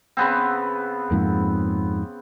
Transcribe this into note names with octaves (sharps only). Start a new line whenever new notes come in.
C#3 B3 C4
F2 G#2 A#3